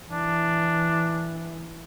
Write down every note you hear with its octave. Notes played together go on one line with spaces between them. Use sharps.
E3 D4